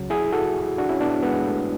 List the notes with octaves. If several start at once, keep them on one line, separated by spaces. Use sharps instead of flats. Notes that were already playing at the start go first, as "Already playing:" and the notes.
Already playing: C#2 C#3 F#3
E4 G#4
F#4 A4
D4 F#4
C#4 E4
B3 D4
G#3 B3
A3